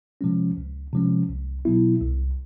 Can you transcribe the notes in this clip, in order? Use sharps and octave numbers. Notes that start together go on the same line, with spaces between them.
C3 F3 G#3 C#4
C#2
C3 F3 G#3 C#4
C2
B2 F#3 B3 E4
C2